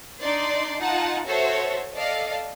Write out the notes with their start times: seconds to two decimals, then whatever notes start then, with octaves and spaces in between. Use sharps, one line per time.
0.20 D4 D#4 D5 C6
0.78 D#4 F4 F#5 A5
1.24 F#4 A4 C5 C#5 E5
1.95 A4 D5 D#5 F5